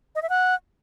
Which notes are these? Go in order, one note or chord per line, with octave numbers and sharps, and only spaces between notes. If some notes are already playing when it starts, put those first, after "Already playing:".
D#5
E5
F#5